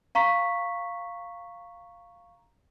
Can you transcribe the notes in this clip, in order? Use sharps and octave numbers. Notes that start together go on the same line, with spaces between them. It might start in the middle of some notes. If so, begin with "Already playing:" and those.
F5 A#5 C#6 B6